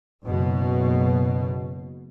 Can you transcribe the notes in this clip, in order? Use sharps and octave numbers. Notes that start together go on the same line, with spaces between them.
F#1 B2